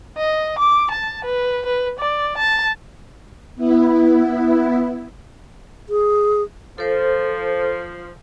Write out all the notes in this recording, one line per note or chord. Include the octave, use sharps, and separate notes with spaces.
D#5
D6
A5
B4
B4
D5
A5
B3 E4
G#4
F3 A4 C5